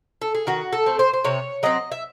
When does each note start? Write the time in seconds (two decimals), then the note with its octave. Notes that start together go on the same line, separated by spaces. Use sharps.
0.22 A4
0.35 G#4
0.47 D#3 F#4
0.73 A4
0.86 A3 C4
0.99 C5
1.13 C5
1.24 C3 C#5
1.63 F#3 C4 D#5
1.92 E5